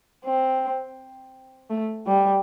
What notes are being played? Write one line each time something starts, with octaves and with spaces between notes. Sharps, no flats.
C4
A3
G3